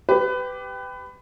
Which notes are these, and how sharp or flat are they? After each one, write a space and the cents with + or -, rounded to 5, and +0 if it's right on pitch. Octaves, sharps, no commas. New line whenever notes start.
G4 +0 B4 +25